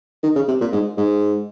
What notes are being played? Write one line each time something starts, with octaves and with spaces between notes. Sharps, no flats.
D#3
C#3
C3
A#2
G#2
G#2